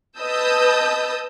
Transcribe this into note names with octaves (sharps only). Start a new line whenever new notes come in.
B4 D#5 A5 D#6 E6 G6